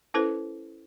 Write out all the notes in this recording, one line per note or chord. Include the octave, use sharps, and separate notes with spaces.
C#4 E4 A4 B4 C5